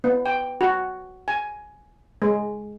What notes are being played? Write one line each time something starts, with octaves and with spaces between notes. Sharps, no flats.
B3
G5
F#4
G#5
G#3